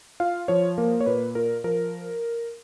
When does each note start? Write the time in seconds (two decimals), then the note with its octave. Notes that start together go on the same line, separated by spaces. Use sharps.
0.20 F4 F5
0.48 F3 C#5
0.78 A#3 A#4
1.01 C#5
1.06 A#2 B4
1.35 F4 A#4
1.64 F3 A#4